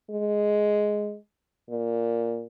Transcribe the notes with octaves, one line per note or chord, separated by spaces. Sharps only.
G#3
A#2